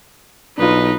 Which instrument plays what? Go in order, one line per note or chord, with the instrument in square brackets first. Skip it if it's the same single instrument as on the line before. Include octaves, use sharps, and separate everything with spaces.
[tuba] B1 [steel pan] D4 F4 [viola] D#4 B4